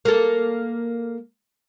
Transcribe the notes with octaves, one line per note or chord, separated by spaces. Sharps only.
A#3 A4